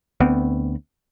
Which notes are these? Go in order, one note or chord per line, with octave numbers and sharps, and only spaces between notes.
D2 B3 C4